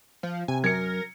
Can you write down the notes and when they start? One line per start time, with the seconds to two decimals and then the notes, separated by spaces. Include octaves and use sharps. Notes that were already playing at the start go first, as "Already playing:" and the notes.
0.23 F3
0.48 C3 G#5
0.64 F#2 A#4 G#6 C#7